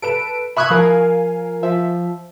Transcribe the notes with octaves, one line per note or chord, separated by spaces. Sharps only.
A4 B4 D7 E7
E5 B5 C#6 D#6 F#6 G#6
F3 A#4 F5 G#5
F3 E5